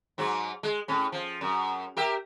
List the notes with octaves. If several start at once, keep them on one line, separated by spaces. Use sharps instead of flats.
G#2 F#3
G#3
A2 C#4
F3
F#2
G4 A#4 E5